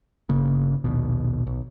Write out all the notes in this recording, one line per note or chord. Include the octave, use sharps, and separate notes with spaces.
G1 C#3 A#3
A#1 D#2 B2
B1